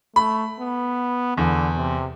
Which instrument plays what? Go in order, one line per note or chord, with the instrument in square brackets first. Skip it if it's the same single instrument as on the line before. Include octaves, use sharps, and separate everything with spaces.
[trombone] A3 [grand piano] B5
[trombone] B3
[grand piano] E2 [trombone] D3
[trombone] C3